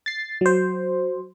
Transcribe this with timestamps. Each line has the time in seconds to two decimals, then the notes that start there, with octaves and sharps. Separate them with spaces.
0.06 A6 C7
0.41 F#3 C5